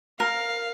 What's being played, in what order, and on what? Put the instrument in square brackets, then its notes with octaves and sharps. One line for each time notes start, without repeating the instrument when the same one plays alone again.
[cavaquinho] A#4 [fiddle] F5